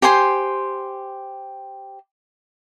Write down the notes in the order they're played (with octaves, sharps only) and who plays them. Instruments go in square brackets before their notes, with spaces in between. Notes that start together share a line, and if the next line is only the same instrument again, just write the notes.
[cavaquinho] G4 C5 G#5 C6